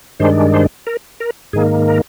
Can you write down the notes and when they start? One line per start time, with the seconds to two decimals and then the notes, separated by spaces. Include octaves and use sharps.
0.20 G2 D#3 G#3 D4 C5
0.54 C5
0.87 A#4
1.20 A#4
1.53 G#2 D#3 A#3 G#4
1.88 A#4